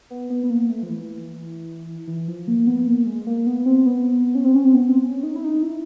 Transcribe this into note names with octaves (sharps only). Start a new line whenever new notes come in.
B3
B3
B3
A#3
A3
F3
E3
E3
F3
A#3
B3
A#3
G#3
A#3
B3
C4
B3
C#4
C4
C#4
C4
B3
C4
C#4
D#4
E4
D#4
E4